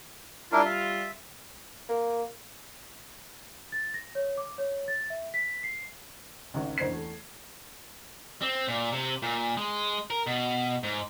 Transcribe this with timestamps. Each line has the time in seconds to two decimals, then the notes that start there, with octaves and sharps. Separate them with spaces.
0.52 G3 D4 E4 F4 A#4
0.65 E5
1.89 A#3
3.72 A6
3.94 A#6
4.15 C#5
4.38 D6
4.58 C#5
4.88 A6
5.10 E5
5.34 B6
5.63 C7
6.54 G#1 C#2
6.78 F#1 D2 C5 G#6 C7
6.89 E2 A3
8.42 C4
8.68 A#2
8.92 C3
9.22 A#2
9.57 G#3
10.10 A#4
10.27 B2
10.83 G#2